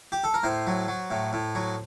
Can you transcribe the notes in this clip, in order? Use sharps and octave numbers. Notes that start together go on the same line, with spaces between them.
G4
A4
A#4
A2 C5
F#3
F#3
A2
A2
F#3